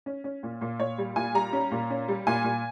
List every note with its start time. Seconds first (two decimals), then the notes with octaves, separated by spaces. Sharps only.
0.06 C#4
0.24 C#4
0.43 A#2
0.61 A#2
0.79 A#2 C#5
0.98 G3
1.16 A#2 G#5
1.34 G3 A#5
1.53 C#4
1.71 A#2
1.90 C#4
2.08 G3
2.27 A#2 G#5
2.44 A#2